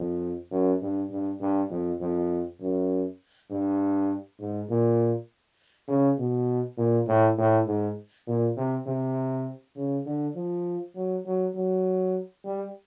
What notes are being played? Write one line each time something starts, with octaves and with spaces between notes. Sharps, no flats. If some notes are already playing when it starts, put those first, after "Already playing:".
Already playing: F2
F#2
G2
G2
G2
F2
F2
F#2
G2
G#2
A#2
C#3
B2
A#2
A2
A2
G#2
A#2
C3
C3
C#3
D3
F3
F#3
F#3
F#3
G3